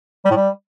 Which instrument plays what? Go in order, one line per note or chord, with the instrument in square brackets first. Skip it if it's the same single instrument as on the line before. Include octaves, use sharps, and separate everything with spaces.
[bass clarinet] G3
A2
G3